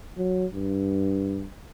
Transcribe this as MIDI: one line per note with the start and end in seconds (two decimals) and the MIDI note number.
0.17 0.46 54
0.54 1.47 43